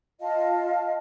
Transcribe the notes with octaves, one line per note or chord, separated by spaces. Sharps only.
F4 D#5 F5 A5